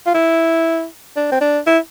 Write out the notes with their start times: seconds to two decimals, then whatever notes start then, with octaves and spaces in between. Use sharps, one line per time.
0.06 F4
0.14 E4
1.16 D4
1.32 C4
1.41 D4
1.66 E4